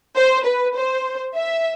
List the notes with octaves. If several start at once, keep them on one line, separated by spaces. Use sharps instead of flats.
C5
B4
C5
E5